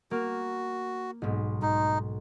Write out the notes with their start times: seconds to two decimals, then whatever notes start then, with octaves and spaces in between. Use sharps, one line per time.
0.11 A#3 F#4 F6
1.22 B1 G#2
1.62 G#2 D#4